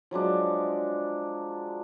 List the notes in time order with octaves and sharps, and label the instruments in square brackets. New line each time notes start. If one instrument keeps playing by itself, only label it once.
[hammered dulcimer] F3 F#3 G#3 D4